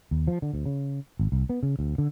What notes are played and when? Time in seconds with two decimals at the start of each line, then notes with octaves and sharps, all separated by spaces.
0.11 D#2
0.27 F3
0.42 D3
0.53 D2
0.66 C#3
1.19 G#1
1.32 C2
1.50 B3
1.63 C#3
1.79 D2
1.98 D3